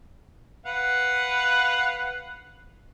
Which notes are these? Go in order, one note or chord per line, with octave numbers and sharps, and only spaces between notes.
B4 F5 F#5